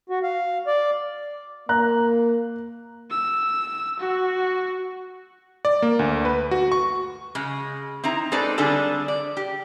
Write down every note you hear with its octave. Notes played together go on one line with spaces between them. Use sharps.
F#4
F5
D5
A#3 A#5 F#6
E6
F#4
D5
A#3
D2
B4
F#4
C#6
C#3 G#3
C4 D#4 E4 A#5
G#3 C4 D#4 A4 B4 D5
D3 G3 D4 G#4 A4
D5
G4